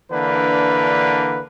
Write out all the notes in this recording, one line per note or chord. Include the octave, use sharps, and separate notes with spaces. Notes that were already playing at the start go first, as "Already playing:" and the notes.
D3 E3 A#3 D4 B4